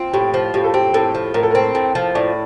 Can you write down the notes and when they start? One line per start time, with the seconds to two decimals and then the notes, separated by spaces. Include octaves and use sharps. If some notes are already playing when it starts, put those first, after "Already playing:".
Already playing: C4 F4
0.13 A2 G4
0.34 F3
0.54 A2 G4
0.64 A4
0.74 C4 G4
0.94 A2 A4
1.15 F3
1.34 A2 A#4
1.43 A4
1.51 C4 A#4
1.75 A2
1.95 F3
2.15 A2 D5